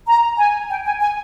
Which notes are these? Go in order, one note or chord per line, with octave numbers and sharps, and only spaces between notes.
A#5
G#5
G5
G#5
G#5